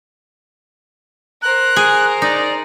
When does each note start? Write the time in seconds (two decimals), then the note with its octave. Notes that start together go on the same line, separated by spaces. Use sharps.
1.42 A#4 C5 F#6
1.76 G#4
2.22 D#4 D5